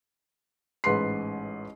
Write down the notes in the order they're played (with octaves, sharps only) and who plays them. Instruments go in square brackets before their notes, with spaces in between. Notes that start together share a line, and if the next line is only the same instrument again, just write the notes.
[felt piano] A1 G#2 B4 C6 C7